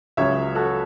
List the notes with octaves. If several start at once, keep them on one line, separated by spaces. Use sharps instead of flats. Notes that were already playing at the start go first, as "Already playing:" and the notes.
C#2 C#3 F#3 C#5 E5
F#4 A4